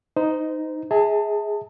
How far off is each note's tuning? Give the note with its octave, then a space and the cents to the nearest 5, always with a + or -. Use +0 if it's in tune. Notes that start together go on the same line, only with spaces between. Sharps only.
D#4 +0 C5 -30
G#4 +0 E5 -35 A5 +30